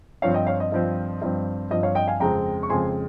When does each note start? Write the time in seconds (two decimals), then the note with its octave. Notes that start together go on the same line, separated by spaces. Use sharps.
0.22 G2 F3 C4 C#5 F5
0.34 D#5 G5
0.47 C#5 F5
0.60 D#5
0.72 G2 F3 C4
1.22 G2 F3 C4
1.71 G2 F3 C4 D#5
1.83 C#5 F5
1.95 D#5 G5
2.08 F5 G#5
2.20 F2 C#3 G#3 C4 G5 A#5
2.63 C#6
2.70 F2 C#3 G#3 C4 G#5 C6